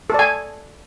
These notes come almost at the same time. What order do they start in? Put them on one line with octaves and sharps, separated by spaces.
A4 D5 G#5